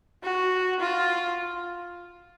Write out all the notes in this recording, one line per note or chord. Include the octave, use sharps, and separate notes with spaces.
F#4
F4